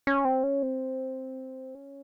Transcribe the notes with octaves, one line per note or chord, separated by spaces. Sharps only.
C#4
C4
C#4
C4
C#4